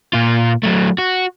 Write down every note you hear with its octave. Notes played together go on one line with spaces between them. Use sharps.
A#2 F4
F#3 A3
F#4